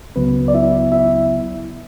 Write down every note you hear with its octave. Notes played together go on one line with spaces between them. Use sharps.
C#2 C#3 F#3 B3 B4
D5
E4 E5
E4 E5